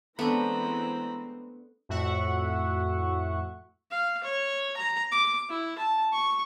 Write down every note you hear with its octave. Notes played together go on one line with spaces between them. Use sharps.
E3 G#3 A3 B3 C4 D4 A#5 B5
F2 A2 F#4 E5 F#5 C#6
F5
C#5
A#5
D6
E4
A5
C#6